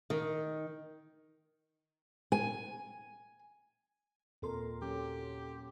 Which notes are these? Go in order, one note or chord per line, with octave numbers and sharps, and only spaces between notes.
D#3
G#5
D#2 A#2 C4 A4 A#4 C6
F#3 C#4 G4